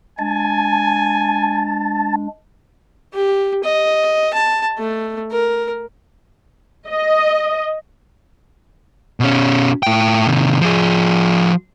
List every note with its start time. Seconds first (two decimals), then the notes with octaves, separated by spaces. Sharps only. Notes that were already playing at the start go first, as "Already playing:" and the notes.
0.19 G#3 D4 G#5 A5
3.14 G4
3.64 D#5
4.33 A5
4.78 A3
5.31 A#4
6.87 D#5
9.20 B2 C#4
9.83 A2 G5
10.28 C3 D#3
10.62 F3 G#4